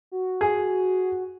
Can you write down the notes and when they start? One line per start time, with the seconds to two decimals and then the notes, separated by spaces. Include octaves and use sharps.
0.11 F#4
0.41 G#4